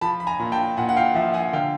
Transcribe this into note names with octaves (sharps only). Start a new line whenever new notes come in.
F3 A5 B5
B5
G#5 A#5
A#2
G5 A5
A#2 F#5 G#5
F#5
F5 G5
F3 E5 F#5
F#5 G#5
D3 F5 G5